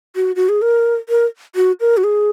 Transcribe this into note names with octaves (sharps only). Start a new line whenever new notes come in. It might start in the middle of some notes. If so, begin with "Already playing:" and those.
F#4
F#4
G#4
A#4
A#4
F#4
A#4
F#4
G#4